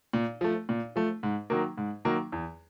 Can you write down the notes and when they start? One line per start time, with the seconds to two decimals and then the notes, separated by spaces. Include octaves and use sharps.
0.13 A#2
0.41 F3 A3
0.69 A#2
0.96 F3 A3
1.23 G#2
1.50 D#3 F#3 A#3
1.78 G#2
2.05 D#3 F#3 A#3
2.32 E2